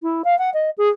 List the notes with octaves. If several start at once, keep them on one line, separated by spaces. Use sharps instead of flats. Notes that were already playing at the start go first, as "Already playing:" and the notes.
E4
F5
F#5
D#5
G#4